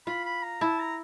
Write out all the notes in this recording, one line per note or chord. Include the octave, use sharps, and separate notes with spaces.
F4 B5
B5
A#5
E4 A5
A#5